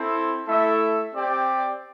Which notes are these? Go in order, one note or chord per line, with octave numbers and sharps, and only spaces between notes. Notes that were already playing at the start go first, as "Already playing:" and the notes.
Already playing: C4 E4 A4 C5
A3 E4 A4 E5
C4 G4 D5 G5